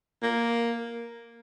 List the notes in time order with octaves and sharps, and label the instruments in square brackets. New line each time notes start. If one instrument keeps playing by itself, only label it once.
[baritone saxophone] A#3